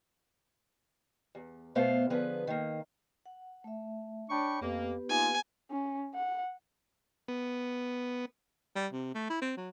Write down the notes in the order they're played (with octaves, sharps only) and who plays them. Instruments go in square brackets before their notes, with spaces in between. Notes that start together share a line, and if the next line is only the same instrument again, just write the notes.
[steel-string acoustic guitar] E2
B2 A3 B3 C5 F5
D3 F3 B3 G#4 B4
D#3 A#3
[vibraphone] F#5
A3 E5
[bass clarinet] D4 [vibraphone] C#5 [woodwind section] G5 B5 C#6
[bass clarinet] F2 [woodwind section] A#3 [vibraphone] B3 G4 B4
[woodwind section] A#3 F4 [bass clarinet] D#4 [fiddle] G#5
[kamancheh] C#4
F#5
[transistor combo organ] B3
[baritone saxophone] G3
C3
A3
E4
C4
F#3